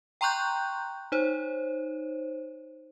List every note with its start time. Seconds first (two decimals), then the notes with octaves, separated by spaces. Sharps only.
0.21 G5 A#5 C6 C#6 F#6 G6
1.12 D#4 C5 C#5